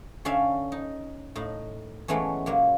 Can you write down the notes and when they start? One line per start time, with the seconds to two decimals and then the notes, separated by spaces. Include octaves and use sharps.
0.25 D3 C#4 D5 E5 F5
0.72 D#4
1.35 A2 D#4
2.08 E3 G#3 A3 B3 C#4
2.46 A#2 F#3 A#3